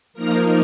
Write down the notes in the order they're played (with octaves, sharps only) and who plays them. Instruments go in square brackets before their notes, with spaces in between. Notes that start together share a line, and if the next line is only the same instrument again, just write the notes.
[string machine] F3 A#3 D#4 A#4 A#5